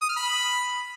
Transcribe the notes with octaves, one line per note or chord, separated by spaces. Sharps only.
D#6
F6
B5